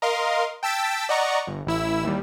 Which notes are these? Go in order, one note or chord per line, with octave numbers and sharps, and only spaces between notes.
A#4 D#5 F5 C6
G5 A5 E6 A6 B6 D7
D5 D#5 F#5 A#5 C#6
G1
A1 E4 E6
D#2 G3